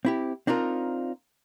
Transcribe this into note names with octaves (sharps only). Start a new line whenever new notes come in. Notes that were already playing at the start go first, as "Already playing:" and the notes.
C4 E4 G4
C4 D4 D#4 F4 A#4